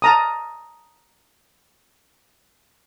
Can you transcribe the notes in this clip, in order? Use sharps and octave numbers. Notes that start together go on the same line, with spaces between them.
A5 A#5 D#6